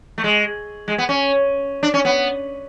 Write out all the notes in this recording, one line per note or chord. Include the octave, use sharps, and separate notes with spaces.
A3
G#3
G#3
B3
C#4
D4
C#4
B3